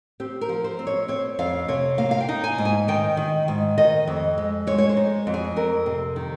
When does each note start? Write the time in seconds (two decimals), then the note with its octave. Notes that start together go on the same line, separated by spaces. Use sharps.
0.20 C4 G4
0.41 A#4
0.49 F3
0.64 C5
0.79 C4
0.87 C#5
1.08 C4 C#5
1.39 F2 F5
1.68 C3 C#5
1.98 A#3 F5
2.11 F5
2.20 G5
2.29 D#4
2.44 G#5
2.58 G#2
2.65 G#5
2.88 D#3 G5
3.17 D#3
3.48 G#2
3.78 D#3 D#5
4.07 F2
4.38 G#3
4.67 G#3 C#5
4.78 C#5
4.89 C5
4.97 D#4
5.27 F2
5.34 G#4
5.56 F2 A#4
5.86 C3
6.16 D#3